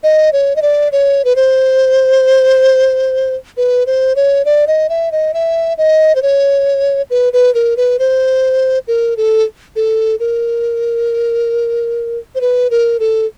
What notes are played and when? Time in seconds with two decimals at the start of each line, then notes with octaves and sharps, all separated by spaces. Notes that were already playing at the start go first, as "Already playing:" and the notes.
0.03 D#5
0.33 C#5
0.56 D#5
0.62 D5
0.92 C#5
1.25 B4
1.36 C5
3.57 B4
3.87 C5
4.16 C#5
4.45 D5
4.67 D#5
4.89 E5
5.12 D#5
5.34 E5
5.78 D#5
6.15 C5
6.22 C#5
7.10 B4
7.33 B4
7.55 A#4
7.77 B4
7.99 C5
8.88 A#4
9.17 A4
9.76 A4
10.20 A#4
12.35 C5
12.41 B4
12.71 A#4
13.00 A4